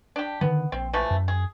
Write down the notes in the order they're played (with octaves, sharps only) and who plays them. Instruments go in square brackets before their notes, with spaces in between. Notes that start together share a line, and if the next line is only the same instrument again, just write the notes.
[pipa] D4 G4
[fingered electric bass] D3 D#3 F3 [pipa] B3
[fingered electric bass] A#1 [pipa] C4
[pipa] E3 F3 A3
[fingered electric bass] F#2
[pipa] G#4